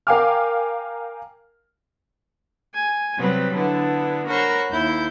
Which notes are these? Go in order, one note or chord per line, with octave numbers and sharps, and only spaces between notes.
A#4 F5 G5 G#5 D6 F6
G#5
C3 F#3 G3 B3 C4 B4
D3 B3 D4 E4
F#4 A#4 C5 C#5 B5 C#6
D#2 E4 G6